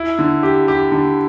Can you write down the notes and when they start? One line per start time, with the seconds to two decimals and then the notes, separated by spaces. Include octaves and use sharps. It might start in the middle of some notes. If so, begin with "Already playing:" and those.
Already playing: E4
0.19 D3
0.43 G4
0.68 G4
0.92 D3